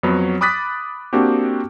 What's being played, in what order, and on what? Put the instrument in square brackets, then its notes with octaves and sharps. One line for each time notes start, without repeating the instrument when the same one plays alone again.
[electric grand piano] F2 F#3 B3 C#5
B5 D6 D#6 F#6 A6 B6
A#3 C4 D4 F#4 G4